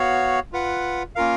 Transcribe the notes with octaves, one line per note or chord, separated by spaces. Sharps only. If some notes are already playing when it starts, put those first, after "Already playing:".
Already playing: B3 F#4 C#5 F5
F4 B4 F#5
A#3 C#4 F4 A#4 F5